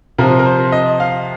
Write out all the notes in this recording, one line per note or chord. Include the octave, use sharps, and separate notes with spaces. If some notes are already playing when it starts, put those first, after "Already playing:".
C3 F3 C4 A#4
A#4
C5
D#5
F5